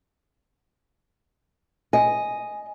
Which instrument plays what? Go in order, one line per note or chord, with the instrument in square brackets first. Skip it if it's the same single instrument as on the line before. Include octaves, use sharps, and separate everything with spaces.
[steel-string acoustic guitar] D#5 [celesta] G#5